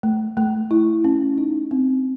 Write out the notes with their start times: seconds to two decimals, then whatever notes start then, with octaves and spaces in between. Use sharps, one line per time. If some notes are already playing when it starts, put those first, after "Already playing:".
0.03 A3
0.37 A3
0.71 E4
1.04 C#4
1.38 D#4
1.71 C4